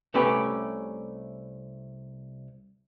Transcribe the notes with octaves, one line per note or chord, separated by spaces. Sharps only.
C2 A3 C#4 G4 B4